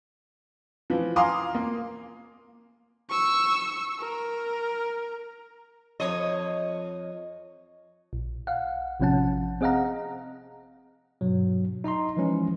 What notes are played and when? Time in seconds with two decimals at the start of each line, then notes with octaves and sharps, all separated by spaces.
0.90 E3 F3
1.16 F5 G#5 A#5 C6 D6 D#6
1.55 A#3
3.10 C#6 E6
4.00 A#4
6.00 F2 C#5 D#5
8.13 A#1
8.47 F5 F#5
9.00 A1 C3 F3 C#4 F#5 A5
9.61 C4 G#4 D#5 F5 F#5 A#5
11.21 G2 B2 F#3
11.84 D#4 D#5 A#5 C6
12.17 E3 F3 G#3 C#4 E4